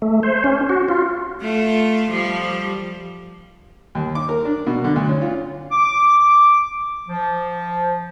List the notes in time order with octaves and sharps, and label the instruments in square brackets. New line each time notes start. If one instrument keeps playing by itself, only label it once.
[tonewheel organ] A3
C5
C#4
F#4
F4
[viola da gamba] A3 F4
F3 G3
[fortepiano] D#2
D6
A#4
D4
B2
D3
D2
C#4
F4
[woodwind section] D6
F3